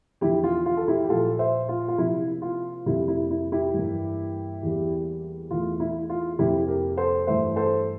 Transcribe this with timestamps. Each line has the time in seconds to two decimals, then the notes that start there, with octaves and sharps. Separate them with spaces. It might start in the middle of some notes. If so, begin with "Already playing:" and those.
0.21 E2 D3 F3 E4 G4
0.44 F4
0.66 F4
0.77 A4
0.88 E4 G4
1.04 G4
1.10 A#2 F3 A#3 F4 A4
1.39 C5 E5
1.69 F4
1.88 F4
1.98 C3 F3 A#3 E4
2.42 F4
2.86 F2 C3 G3 A#3 E4
3.08 E4
3.31 E4
3.52 E4 G4
3.74 G2 E3 A#3
4.63 E2 E3 G3 A#3
5.51 E2 E3 A3 F4
5.80 E4
6.10 F4
6.39 F2 C3 F3 A#3 E4 G4
6.68 G4 A#4
6.97 A4 C5
7.27 G2 E3 A3 C5 E5
7.56 A4 C5